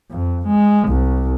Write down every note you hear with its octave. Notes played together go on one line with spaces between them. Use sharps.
F2
G#3
C2